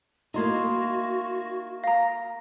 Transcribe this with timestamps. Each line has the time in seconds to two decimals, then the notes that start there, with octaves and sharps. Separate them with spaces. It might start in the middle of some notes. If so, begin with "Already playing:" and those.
0.34 A#3 D#4 E4 F#4 D#5 C6 G#6
1.84 F5 A#5 A#6